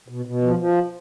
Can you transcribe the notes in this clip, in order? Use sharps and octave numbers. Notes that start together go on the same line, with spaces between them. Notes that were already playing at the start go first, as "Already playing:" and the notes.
B2
B2
F3
F3